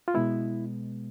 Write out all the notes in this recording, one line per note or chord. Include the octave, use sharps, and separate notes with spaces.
F4
B2 G#3 B3 E4